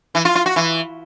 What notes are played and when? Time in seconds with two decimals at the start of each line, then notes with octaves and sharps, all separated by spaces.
0.15 E3
0.25 F4
0.35 F4
0.46 F#4
0.56 E3